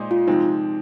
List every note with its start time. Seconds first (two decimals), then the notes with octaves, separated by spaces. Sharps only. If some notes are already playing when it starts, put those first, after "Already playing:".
Already playing: A#2 G#3 D#4 C5
0.11 F4
0.27 C3 F3 G#3 C4 D#4